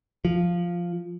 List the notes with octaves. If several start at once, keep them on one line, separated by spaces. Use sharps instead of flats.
F3